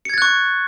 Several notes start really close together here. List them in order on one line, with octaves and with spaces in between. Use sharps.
C#7 G#6 A6 F#6 C#6